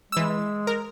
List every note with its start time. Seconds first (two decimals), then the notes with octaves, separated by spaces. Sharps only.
0.12 E3 G#3 E6
0.67 A#4